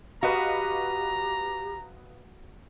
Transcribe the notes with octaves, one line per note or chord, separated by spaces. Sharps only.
F#4 G4 B4 D#5 F5 A#5